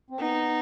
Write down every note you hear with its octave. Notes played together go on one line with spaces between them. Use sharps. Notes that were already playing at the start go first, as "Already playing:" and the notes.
C4
B3 D#4